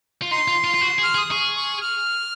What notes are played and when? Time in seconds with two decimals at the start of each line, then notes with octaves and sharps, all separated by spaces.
0.22 F4
0.31 D#4 C6
0.48 F4
0.64 F4
0.74 F4
0.81 F#4
0.98 G#4
1.04 F6
1.15 G#4
1.17 D#6
1.31 G#4 C#6
1.56 C#6
1.81 F6